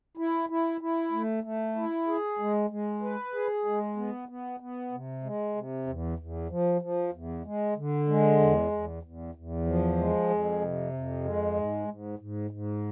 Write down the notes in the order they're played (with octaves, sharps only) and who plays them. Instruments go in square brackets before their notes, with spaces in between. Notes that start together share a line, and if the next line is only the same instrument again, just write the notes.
[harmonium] E4
E4
E4
A3
A3
E4
G#4
G#3
G#3
B4
G#4
G#3
B3
B3
B3
C3
G#3
C3
E2
E2
F3
F3
E2
G#3
D3
G#3
E2
E2
E2
E2
F3
G#3
F2
C3
F2
G#3
G#2
G#2
G#2
G#2